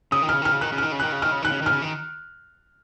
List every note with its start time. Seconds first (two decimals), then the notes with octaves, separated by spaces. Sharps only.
0.12 C#3 D#6
0.22 D#3
0.29 C#3 F6
0.42 D#3 F6
0.52 C#3
0.61 D#3 F#6
0.72 C#3
0.78 D#3 F6
0.92 C#3
1.00 D#3 F#6
1.12 C#3
1.22 D#3 F6
1.32 C#3
1.42 D#3 F#6
1.52 C#3
1.62 D#3 F6
1.72 C#3
1.82 D#3